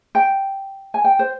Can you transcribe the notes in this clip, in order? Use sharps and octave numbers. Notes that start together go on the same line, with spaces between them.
G5
G#5
G5
C5